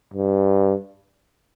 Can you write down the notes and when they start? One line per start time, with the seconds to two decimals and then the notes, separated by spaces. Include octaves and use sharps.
0.14 G2